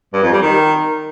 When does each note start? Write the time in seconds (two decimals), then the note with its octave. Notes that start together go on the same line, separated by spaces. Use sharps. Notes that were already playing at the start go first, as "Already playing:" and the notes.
0.13 G2
0.23 F2
0.32 G3
0.42 D#3